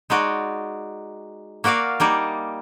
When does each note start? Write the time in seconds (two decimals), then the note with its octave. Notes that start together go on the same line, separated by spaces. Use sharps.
0.10 G#3 D#4 F#4 D5
1.64 A#3 F#4 A#4 D5 F5
2.00 G3 A#3 D#4 D5